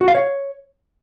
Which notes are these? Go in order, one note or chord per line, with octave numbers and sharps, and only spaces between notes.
F#4
F5
C#5